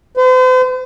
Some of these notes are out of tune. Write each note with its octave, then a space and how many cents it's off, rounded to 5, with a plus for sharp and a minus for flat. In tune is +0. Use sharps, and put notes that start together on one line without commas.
C5 -45